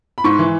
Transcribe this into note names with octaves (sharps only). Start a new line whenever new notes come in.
B5
G#2 C#6
E3